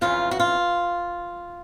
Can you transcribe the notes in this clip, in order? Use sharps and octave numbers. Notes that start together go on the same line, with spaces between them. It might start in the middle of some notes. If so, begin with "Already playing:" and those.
F2 C#3 E3 F4
F#4
F4